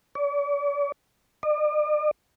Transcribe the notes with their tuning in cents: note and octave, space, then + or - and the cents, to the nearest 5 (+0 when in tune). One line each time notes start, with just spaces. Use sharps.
D5 -45
D5 +45